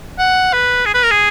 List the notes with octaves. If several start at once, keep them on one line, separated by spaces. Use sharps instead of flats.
F#5
B4
G#4
B4
A#4
G#4